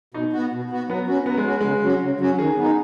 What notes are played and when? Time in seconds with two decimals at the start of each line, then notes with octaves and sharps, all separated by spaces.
0.14 B2 D#4
0.33 B3 F#4
0.51 B2
0.70 B3 F#4
0.89 F#3 B3
1.08 C#4 F#4
1.26 F#3 B3
1.37 G#3
1.45 C#4 F#4
1.60 C#3 G#3
1.82 F#3 C#4 F#4
2.01 C#3
2.20 F#3 C#4 F#4
2.38 D#3 G#4
2.57 B3 D#4